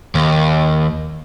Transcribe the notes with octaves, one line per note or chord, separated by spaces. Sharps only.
D#2